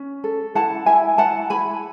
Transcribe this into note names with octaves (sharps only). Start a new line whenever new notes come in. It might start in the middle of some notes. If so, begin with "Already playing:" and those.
Already playing: C#4
A4
E4 F#5 A5
E4 E5 G#5
E4 F#5 A5
E4 G#5 B5